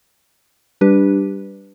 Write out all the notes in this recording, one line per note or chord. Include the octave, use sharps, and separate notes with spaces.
G3 D4 G4 B4